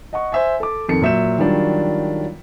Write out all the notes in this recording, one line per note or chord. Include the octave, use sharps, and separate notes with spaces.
D#5 F#5 C#6
C5 E5 G#5
A4 D6
F2 D#3 A4 C#7
A#2 F#3 E5 G6 E7
D#3 F#3 G3 D4 F4